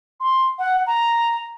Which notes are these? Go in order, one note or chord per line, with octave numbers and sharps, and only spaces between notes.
C6
F#5
A#5